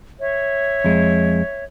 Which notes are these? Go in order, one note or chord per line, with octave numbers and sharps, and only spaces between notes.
C#5 E5
F2 G#3